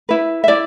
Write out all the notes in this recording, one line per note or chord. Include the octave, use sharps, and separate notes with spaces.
E4 B4
E5
E4 D5